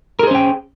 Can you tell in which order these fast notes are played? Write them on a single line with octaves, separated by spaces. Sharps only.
A#4 G#4 C5 C#4 G5